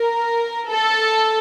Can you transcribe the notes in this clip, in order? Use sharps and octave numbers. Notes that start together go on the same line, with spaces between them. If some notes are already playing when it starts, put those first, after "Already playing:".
Already playing: A#4
A4